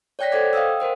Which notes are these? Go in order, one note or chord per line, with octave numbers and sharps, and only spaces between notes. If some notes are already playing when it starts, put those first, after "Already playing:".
C#5 D5 G5 F#6 A#6 B6
A4 C5 D#5 F#5 D6 G#6
D#5 F5 G5 D#6 E6
A#4 C5 F#5